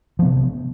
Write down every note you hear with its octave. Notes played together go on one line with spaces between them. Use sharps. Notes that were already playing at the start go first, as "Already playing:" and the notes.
C3 F3 B3